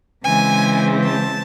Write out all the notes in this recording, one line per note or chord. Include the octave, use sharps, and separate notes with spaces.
C#3 E3 G#3 C4 G#5
A5